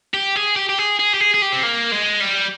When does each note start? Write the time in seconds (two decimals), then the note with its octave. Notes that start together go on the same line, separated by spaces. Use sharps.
0.14 G4
0.36 G#4
0.56 G4
0.69 G4
0.78 G#4
0.99 G#4
1.14 G4
1.20 G#4
1.34 G#4
1.42 G4
1.53 C4
1.63 A#3
1.92 G#3
2.21 G3